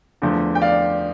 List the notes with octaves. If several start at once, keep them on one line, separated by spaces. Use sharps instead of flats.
E2 D3 F3 A3
G5
D5 F5